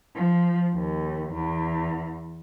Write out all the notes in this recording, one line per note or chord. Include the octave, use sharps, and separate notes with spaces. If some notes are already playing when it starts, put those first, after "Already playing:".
F3
D#2
E2